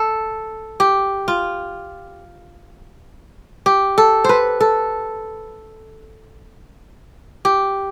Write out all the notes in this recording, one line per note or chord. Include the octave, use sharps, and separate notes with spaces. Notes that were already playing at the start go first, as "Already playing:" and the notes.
Already playing: A4
G4
F4
G4
A4
B4 C5
A4
G4